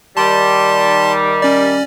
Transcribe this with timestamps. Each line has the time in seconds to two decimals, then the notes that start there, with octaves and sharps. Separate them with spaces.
0.17 D#3 G3 A5 C6
1.42 C#4 D5